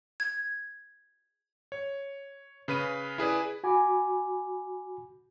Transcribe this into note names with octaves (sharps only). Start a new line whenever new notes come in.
G#6
C#5
C#3 B4 B5 D#7
E4 G#4 B4 D5
F#4 G#5 B5 D6